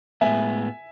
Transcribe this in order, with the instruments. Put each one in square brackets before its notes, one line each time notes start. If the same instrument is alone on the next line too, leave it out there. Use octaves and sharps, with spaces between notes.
[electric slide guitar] A2 G#3 B3 [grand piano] E5 G#5